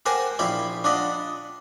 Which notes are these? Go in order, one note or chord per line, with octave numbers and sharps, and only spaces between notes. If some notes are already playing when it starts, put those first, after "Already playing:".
G4 A#4 C5 F#5 G#5 A5
A#1 E4 G4 F5 B5 C6
D4 F4 D5 D#5 F#5 B5